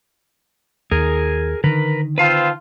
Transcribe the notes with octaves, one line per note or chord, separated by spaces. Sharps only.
D#2 G#4 A#4
D3 D#3 A#4 B4
C4 F4 B4 F5 A5